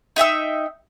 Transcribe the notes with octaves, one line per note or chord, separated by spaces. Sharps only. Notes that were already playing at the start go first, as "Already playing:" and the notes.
D#4 E5 G5 E6